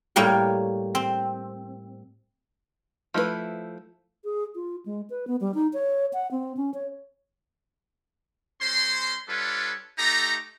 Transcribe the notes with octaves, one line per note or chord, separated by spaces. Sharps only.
A2 G3 A#3 C#5 G5
C4
F3 A3 E4 F4 B4
G#4
F4
G#3
B4
B3
G3
D#4
C#5
F#5
C4
C#4
C#5
G#3 C#4 C5 C6
G3 D4 F4 A4 B4 C#5
A3 D#4 G4 A4 A#5